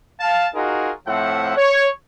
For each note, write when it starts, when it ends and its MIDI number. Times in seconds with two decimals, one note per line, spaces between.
0.19 0.46 77
0.19 0.46 81
0.54 0.90 63
0.54 0.90 65
0.54 0.90 66
0.54 0.90 68
0.54 0.90 70
1.06 1.54 45
1.06 1.54 53
1.06 1.54 60
1.06 1.54 76
1.06 1.54 78
1.56 1.87 73